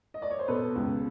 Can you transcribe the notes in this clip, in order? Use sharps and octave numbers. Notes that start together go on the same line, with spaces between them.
D#5
D5
C#5
C5
B2 A4 B4
C#2